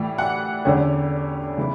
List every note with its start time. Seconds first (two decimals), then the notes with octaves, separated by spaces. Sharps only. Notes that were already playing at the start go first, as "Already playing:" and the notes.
Already playing: A2 E3 G3
0.18 F#5
0.65 E2 D3 G3 C#4
1.57 C#3 E3 B3 E4